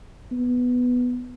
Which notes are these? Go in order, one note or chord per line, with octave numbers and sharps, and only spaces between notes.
B3